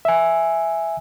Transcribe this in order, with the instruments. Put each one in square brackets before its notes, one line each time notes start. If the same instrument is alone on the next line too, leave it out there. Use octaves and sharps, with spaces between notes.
[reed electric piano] E5 G#5